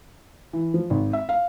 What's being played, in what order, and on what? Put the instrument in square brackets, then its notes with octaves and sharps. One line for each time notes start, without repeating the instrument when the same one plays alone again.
[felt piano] E3
F3
G#1
E5
F5